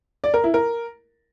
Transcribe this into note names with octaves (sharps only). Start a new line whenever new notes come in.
D5
A#4
E4
A#4